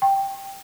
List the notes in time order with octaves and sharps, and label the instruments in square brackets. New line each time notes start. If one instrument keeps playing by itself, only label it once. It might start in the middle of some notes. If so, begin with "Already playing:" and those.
[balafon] G5